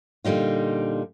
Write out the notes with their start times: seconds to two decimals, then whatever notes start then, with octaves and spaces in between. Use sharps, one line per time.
0.24 A#2 D3 G3 D#4 F4